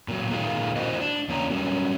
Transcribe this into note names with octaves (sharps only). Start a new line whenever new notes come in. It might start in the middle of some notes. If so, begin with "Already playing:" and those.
A#2 F#3
A#2 D#3 G#3 A#3 F4
E4 F#4 C5 D#5
D4
E2 A#3 C#4 C#5 A#5
F#3 G3 C#4